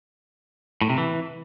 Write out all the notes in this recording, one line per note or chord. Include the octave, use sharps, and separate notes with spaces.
A2
C3
E3